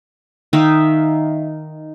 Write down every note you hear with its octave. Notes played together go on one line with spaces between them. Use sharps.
D#3 D#4 E5 F5